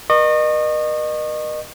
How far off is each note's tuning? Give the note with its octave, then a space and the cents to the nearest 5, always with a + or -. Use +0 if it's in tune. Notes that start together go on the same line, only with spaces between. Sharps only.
A#4 +45 D#5 -35 C#6 -25